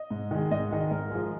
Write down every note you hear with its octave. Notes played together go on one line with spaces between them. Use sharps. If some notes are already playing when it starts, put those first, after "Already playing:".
Already playing: D#5
G#2
D#3 G#3
G#2 D#5
D#3 G#3
G#2 A#4
F3 G#3